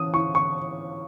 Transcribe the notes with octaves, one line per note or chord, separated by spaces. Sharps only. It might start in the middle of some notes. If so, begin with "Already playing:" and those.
Already playing: E3 C#4 D#6
E4 C#6
C#6